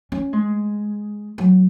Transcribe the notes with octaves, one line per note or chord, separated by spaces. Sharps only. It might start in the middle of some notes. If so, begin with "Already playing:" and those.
C#4
G#3
F#3